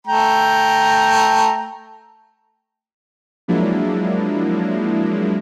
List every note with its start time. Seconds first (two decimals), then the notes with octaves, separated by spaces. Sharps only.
0.07 A3 G5 A#5
3.48 F3 F#3 G#3 A#3 D4 E4